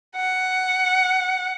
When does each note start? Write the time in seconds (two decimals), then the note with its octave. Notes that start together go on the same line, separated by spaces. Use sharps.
0.16 F#5